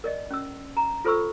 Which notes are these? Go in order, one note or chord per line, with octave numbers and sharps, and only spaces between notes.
A#4 D5 D#5
C#4 E6
A#5
F4 A4 C5 B5 C#6 E6